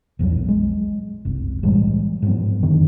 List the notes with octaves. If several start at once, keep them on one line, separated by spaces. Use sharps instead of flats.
A#1 E2 C#3 F#3
G#3
F#1 C2
A2 E3 G3 G#3
G#2 F3 F#3 B3
F#2 D3 D#3